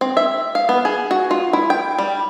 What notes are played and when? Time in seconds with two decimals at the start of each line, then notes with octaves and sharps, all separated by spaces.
0.01 C4
0.17 E5
0.55 F5
0.69 B3
0.85 G#4
1.11 F#4
1.31 F4
1.53 E4
1.70 G5
1.98 G3